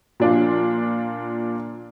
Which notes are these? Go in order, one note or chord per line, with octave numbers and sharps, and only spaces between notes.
A#2 F3 D4 F4